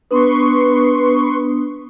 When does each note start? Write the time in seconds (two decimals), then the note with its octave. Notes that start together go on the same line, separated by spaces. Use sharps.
0.11 B3 D4 B4 C6 C#6 D#6